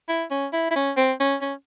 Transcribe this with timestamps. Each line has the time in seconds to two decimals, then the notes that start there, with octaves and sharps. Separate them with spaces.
0.09 E4
0.31 C#4
0.53 E4
0.71 E4
0.76 C#4
0.97 C4
1.20 C#4
1.41 C#4